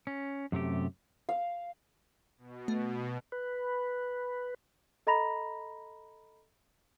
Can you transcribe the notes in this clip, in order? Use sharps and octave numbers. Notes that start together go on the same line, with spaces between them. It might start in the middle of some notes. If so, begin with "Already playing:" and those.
C#4
F#2 C3 A3 G4
F5
B2
A3
B4
A4 D#5 A#5 B5 A#6 F7